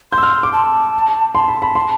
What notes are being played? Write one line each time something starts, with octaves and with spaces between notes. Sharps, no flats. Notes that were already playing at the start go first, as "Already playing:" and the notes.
C6 G6
E6
F6
D6
A5
A5 C6
B5
B5
C6